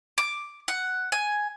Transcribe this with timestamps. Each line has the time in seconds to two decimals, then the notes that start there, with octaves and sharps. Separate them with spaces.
0.18 D6
0.68 F#5
1.12 G#5